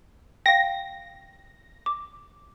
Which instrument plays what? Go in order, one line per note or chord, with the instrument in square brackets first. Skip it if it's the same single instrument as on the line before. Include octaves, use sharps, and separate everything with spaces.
[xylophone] F5 G5 [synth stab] A#6
[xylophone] D6